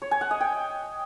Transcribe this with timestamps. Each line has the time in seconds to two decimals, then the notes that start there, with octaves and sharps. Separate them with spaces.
0.02 C#5
0.11 G#5
0.21 F#5
0.31 D#5
0.40 G5